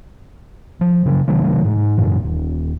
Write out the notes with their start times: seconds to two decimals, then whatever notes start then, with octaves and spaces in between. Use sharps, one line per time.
0.81 F3
1.06 C#3 F#3
1.28 C3 D#3 F#3 A3
1.65 G#2
1.97 F#2 A#2 E3
2.25 D#1